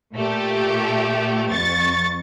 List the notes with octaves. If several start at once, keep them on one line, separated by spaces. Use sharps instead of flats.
A#2 A3 G4
F2 C#6 A6